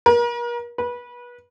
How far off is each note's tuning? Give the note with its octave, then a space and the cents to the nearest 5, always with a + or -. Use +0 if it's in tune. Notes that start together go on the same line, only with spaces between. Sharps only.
A#4 +40
B4 -30